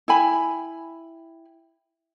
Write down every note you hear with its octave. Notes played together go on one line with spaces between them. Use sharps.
E4 G5 G#5 B5